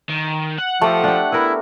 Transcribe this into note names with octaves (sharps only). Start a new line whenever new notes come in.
D#3
F#5
F3 A3 G4 A4
D4 G4
B3 E4 A#4